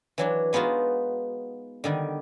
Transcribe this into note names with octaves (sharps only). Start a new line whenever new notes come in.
E3 F#3 D4
G#3 B3 D#4 F4 F#4
D3 D#3 G3